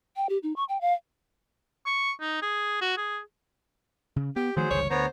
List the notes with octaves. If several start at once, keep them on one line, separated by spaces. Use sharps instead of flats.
G5
G4
D#4
C#6
G5
F5
C#6
D#4
G#4
F#4
G#4
C#3
B3 G4
D#3 F3 F#3 A3 G#4 C5
G1 C#2 E3 C#5
D2 D3 B3 C5 C#5 A#5